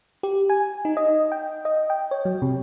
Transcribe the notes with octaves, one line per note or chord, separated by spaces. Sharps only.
G4
G#5
D#4
D#5
G5
D#5
G5
C#5
F#3
C3